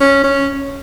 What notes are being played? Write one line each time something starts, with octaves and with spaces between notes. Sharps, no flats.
C#4
C#4